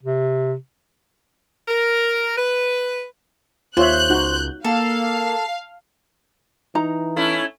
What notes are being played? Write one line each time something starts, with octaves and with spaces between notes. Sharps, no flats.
C3
A#4
B4
D#2 F4 C5 C#5 E5 F#6 G6
C#2 D#4 F#4
A#3 A4 F5
E3 D#4 A#5
A3 C#4 E4